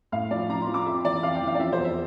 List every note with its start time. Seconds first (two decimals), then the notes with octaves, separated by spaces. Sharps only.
0.12 A2 F5
0.31 F3 D5
0.49 F3 A#5
0.62 C6
0.67 F3
0.74 D6
0.86 F2 E5
1.04 E3 D5
1.23 F2 F5
1.35 G5
1.41 E3
1.47 F5
1.55 D5
1.59 F3 E5
1.72 C5
1.78 E2
1.85 E5